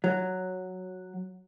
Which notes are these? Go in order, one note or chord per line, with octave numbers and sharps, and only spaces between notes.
F#3